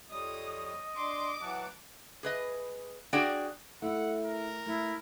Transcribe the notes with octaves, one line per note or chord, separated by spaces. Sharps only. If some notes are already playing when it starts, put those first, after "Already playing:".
F2 G3 C#5 D#5 D#6
D4 C6 D6
E3 F#3 F#5 A5
G#4 B4 D#5
D4 F#4 G#4 D5 F#5 G5
A3 E4 F#5
A#4
A3 E4